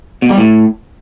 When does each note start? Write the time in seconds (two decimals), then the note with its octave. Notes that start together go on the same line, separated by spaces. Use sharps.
0.22 B2
0.30 G3
0.38 A2